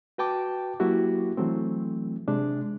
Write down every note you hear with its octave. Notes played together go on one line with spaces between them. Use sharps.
F#4 B4 G5 A5 D6
F#3 A#3 E4 F#4 G4
E3 F#3 A3 C4
C3 G#3 D4